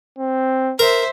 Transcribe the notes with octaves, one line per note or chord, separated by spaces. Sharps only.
C4
A#4 C5 E5